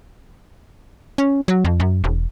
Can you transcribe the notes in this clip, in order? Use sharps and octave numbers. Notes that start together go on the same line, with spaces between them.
C#4
F#3
F2
F#2
E1